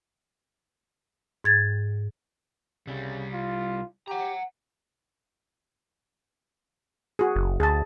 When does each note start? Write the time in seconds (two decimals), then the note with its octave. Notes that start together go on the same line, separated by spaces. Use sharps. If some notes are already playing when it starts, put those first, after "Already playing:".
1.44 G#2 G#6 A6
2.87 C2 C#3 G3
3.33 F4
4.08 G4 F#5 A#5
7.19 F#4 G#4
7.36 F#1
7.60 D2 G#4 A5